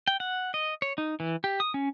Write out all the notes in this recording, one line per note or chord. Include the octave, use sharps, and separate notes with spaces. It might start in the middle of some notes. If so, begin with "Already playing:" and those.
G5
F#5
D#5
C#5
D#4
E3
G4
D#6
C#4